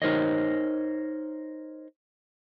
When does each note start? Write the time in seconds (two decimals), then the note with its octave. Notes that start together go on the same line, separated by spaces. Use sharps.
0.02 D#4 A#4 C5 C#5 D#5